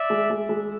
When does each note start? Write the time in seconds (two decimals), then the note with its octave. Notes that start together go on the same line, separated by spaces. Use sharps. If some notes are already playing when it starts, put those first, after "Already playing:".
Already playing: D5 E5
0.10 G#3
0.30 G#3
0.49 G#3